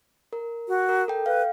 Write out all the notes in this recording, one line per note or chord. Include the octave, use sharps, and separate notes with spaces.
A#4
F#4
A#4
A4 G5
B4 F5